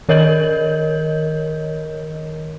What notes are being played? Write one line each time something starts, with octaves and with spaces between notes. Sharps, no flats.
D#3 A#4 C#5 D#5 G6 F#7